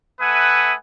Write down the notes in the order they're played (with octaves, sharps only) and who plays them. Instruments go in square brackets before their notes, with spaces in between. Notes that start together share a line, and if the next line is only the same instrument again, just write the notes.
[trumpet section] A3 B4 E5 F#5 G#5 D#6